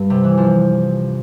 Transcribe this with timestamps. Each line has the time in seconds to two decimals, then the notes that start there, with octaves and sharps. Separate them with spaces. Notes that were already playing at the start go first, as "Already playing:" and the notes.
Already playing: G2
0.10 C3
0.24 E3
0.38 F3